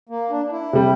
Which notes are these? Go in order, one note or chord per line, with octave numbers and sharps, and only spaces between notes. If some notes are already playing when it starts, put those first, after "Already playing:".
A#3
D4
D4
E4
C3 G3